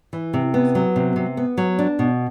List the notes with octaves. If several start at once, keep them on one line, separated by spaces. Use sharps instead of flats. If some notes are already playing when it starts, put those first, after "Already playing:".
E3
C3
B3
F#3
C3
C3
B3
F#3
D4
B2